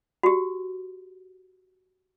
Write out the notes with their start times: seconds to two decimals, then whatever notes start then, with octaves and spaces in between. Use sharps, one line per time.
0.23 F#4 G4